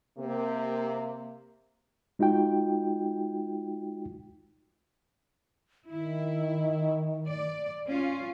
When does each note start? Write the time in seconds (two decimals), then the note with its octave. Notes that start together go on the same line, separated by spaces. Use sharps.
0.18 C3 A#3
2.19 G#3 D#4 F4 F#4 G5
5.90 D#3 E4
7.24 D5
7.87 C#4 F4